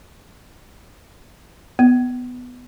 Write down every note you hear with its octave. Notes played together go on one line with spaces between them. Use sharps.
B3